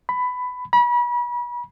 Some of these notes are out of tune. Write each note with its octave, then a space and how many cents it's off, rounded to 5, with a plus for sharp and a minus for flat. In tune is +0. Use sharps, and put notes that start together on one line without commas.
B5 +15
B5 -35